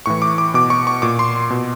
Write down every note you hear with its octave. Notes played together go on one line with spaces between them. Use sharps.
A2 E3 C#6
D6
D6
B2 D6
C#6
C#6
A#2 D6
C6
B2